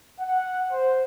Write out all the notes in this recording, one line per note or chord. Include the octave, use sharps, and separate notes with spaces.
F#5
C5